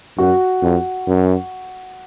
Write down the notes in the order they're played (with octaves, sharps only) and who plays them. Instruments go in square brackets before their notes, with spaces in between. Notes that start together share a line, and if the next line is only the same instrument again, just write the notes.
[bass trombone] F#2 [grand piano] F#4
[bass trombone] F2
F#2